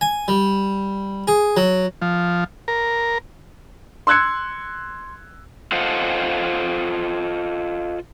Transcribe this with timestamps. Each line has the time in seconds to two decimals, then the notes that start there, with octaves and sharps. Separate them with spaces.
0.01 G#5
0.28 G3
1.28 G#4
1.57 F#3
2.02 F3
2.68 A#4
4.07 C6 E6 F#6 G#6 C#7
5.72 F4 A4 C5 D#5 F5 F#5